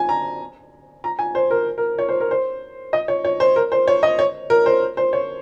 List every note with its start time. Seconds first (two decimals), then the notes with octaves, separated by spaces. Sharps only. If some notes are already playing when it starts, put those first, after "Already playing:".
Already playing: G#5
0.09 A#5
1.04 A#5
1.19 G#5
1.35 C5
1.51 A#4
1.78 A#4
1.99 C#5
2.09 C5
2.20 A#4
2.31 C5
2.93 D#5
3.08 C#5
3.25 C#5
3.40 C5
3.56 A#4
3.72 C5
3.88 C#5
4.03 D#5
4.19 C#5
4.50 A#4
4.66 C5
4.97 C5
5.13 C#5